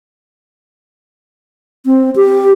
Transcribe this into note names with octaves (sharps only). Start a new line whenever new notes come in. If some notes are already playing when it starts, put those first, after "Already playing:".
C4
G4